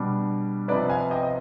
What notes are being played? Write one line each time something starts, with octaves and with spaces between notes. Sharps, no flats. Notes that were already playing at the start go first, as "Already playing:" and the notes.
Already playing: B2 G3 D4
C3 F3 B3 D#4 B4 D5
F5 G#5
D#5 G5
D#5